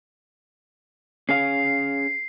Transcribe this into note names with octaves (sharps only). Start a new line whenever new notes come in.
C#4 G#4 F5 C7